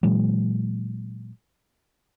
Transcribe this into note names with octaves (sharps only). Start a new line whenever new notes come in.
A#2 E3 F#3 G#3